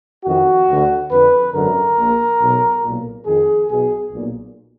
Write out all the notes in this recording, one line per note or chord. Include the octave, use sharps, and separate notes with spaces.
F2 D#3 F#4
D2 D3
F2 D3 B4
G#1 F#2 D3 A#4
A#1 A#2
B1 B2
B1 A#2
F2 D#3 G#4
B1 B2 G#4
B1 A#2